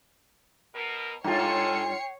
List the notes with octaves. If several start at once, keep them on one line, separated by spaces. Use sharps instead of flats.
B2 A#4
G2 G#3 F4 A4 C#5 G5 C7 C#7